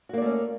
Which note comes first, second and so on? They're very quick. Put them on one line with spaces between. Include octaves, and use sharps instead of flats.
F#4 A#3 D5 A3 C#4